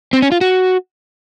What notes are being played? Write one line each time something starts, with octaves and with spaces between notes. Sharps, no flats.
C4
C#4
F4
F#4